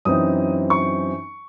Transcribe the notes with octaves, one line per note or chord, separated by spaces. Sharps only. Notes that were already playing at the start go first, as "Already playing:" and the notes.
F#2 E3 C4 D#4 D#6
C#6